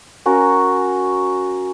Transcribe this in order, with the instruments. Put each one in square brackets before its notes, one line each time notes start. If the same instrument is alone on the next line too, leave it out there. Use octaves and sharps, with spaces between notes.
[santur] C#4 F#4 A#4